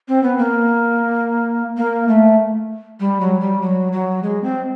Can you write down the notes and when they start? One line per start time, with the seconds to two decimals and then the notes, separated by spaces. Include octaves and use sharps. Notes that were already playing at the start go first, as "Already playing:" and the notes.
0.08 C4
0.23 B3
0.38 A#3
1.77 A#3
2.08 A3
3.00 G3
3.20 F#3
3.41 G3
3.62 F#3
3.92 F#3
4.23 G#3
4.43 C4